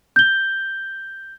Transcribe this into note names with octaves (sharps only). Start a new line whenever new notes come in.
G6 G7